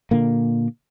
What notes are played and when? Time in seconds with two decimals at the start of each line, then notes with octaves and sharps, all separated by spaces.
0.11 A#2 D3 A#3